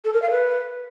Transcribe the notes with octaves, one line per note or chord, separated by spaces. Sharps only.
A4
A#4
F5
B4